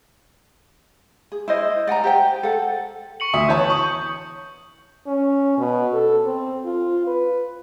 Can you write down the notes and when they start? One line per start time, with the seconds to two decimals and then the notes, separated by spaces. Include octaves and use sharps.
1.32 G#4
1.48 E4 C5 D#5
1.87 D5 F#5 G#5 A#5
2.04 G4 C5 G5
2.43 A4 F#5
3.20 C#6 C#7 F#7
3.34 D2 E5 D#6
3.48 E3 C#5 A5 G6
3.70 C#6 D#6
5.07 C#4
5.58 B2
5.93 A4
6.26 C4
6.65 F4
7.07 B4